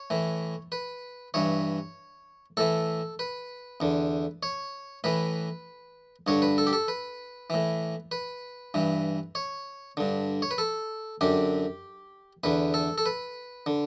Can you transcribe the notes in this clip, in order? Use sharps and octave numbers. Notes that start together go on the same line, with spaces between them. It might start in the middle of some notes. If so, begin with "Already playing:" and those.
Already playing: C#5
A2 E3
B4
G2 E3 C#5
A2 E3 A4
B4
E2 D3
C#5
A2 E3 B4
G2 D3 C#5
B4
A4
G4
A4
B4
A2 E3
B4
G2 E3
C#5
G2 D3
C#5
B4
A4
F#2 D3 G4
E2 D3 B4
A4
A4
B4
D3